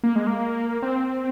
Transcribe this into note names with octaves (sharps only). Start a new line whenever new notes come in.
A#3
G#3
A#3
C4